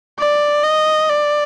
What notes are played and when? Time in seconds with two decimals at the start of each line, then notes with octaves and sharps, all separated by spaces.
0.19 D5
0.63 D#5
1.09 D5